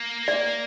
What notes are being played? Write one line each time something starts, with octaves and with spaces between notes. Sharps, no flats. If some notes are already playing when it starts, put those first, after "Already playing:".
Already playing: A#3
D5